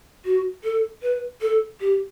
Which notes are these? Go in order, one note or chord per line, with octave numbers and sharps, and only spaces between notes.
F#4
A4
B4
A4
G4